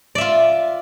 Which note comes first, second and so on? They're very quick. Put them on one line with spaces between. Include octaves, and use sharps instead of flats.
D5 E5 F4